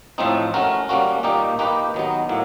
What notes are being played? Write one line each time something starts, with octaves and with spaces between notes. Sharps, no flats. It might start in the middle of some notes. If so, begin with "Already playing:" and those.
A2 F3 A3 C4 D#4
A3 C#4 F#4 A#4
G3 A#3 C#4 F#4
A#2 G3 A#3 D#4 G4
A#3 D#4 G4 B4
D#3 F#3 B3 D#4
A2 F#3 A#3